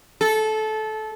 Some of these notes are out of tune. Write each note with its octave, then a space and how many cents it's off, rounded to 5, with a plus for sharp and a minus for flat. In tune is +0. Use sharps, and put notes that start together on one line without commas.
A4 -20